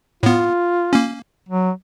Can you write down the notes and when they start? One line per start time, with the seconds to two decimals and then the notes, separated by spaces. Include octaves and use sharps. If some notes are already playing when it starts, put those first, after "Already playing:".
0.23 A2 B3 F4
0.93 A#3 C#4
1.49 F#3